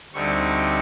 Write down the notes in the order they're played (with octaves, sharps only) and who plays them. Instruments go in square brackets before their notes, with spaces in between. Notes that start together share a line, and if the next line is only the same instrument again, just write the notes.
[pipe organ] D2 D3 G3 C4 D#4 C#6